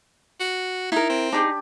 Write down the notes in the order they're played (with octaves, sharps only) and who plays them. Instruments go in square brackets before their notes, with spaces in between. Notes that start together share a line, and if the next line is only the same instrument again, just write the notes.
[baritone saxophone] F#4
[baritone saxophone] D#4 [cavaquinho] E4 A#4
[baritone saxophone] C4
[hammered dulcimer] D4 G4 [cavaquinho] D#4 G#4